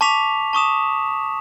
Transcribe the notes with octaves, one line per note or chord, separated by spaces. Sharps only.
A5 C#6 D6 B6 F7
A5 C#6 D#6 E7